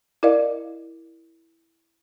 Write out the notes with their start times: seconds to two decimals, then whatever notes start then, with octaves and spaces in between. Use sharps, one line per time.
0.23 E4 A#4 D5 D#5 F5